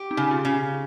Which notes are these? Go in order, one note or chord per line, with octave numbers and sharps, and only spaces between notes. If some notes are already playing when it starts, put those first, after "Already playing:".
Already playing: G4
C4 D#4
C#3
C#4 F4
C#3